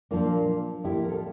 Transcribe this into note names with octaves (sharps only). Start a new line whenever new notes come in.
A#2 F3 A#3 D4 F4
A2 F3 A#3 E4 G4
A#4
F4 A4